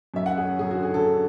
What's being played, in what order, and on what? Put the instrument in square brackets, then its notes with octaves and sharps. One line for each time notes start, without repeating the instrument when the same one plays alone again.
[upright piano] F#2 E5
F#5
C#4
G#4
C#4
F#2 G#4
F#4
D3
G#4
D3 A4
D3